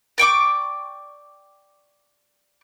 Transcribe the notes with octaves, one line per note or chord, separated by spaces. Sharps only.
D5 G5 C#6 D6